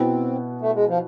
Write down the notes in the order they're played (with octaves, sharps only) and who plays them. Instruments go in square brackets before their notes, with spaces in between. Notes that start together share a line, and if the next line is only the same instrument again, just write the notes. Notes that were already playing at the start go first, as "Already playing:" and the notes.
Already playing: [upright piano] B2 B3 E4 [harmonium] C4
[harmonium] A3
G#3
F3